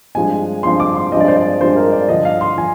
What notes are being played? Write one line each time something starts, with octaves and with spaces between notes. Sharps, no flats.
G2 F3 G#3 C4 G#5
G2 F3 G#3 C4 C6
D6
C6
G2 F3 G#3 C4 D#5
D5
C5
D5
G2 F3 G#3 C4 C5
A#4
D5
G2 D3 F3 D#5
F5
C6
F3 G#5